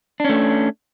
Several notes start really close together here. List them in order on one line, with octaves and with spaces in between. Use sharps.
D4 C#4 A3